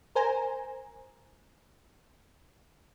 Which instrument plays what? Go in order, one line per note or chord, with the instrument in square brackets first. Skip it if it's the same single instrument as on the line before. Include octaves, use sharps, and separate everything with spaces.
[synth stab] A#4 C5 G#5 A#5